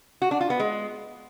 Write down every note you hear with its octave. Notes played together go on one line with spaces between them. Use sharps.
F#4
D4
F4
B3
G#3